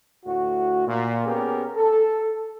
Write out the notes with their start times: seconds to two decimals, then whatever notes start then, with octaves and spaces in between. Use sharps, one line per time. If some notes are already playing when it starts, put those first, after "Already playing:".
0.25 D2 A2 F#4
0.87 A#2
1.26 B3 C#4 G4 G#4 A#4
1.76 A4